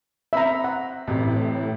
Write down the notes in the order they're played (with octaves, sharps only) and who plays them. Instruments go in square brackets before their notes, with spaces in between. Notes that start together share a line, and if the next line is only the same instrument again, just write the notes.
[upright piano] C4 B5 [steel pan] E5 A#5
[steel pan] F#5
[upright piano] A1 C3 G4 [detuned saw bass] A2